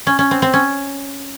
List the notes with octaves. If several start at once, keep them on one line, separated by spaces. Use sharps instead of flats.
C#4
C#4
C4
C4
C#4